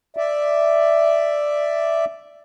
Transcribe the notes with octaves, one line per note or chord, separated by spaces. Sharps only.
D5 E5